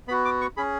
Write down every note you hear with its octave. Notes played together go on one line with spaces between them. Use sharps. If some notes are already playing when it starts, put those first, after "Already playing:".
B3 F#4 B5
D6
C#6
C#4 G#4 B5